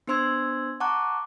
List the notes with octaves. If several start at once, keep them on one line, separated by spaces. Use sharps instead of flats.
B3 D4 C5 C6 E6 G#6
F#5 A5 A#5 C#6 D6 F#6